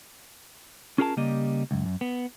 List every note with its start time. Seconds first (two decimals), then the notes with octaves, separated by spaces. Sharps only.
0.98 C#4 F4 G#4 A#4 F#5 A5
1.17 C#3 G3 A#3 G4 D#5
1.71 C#2 F#2
1.86 F#2
2.01 B3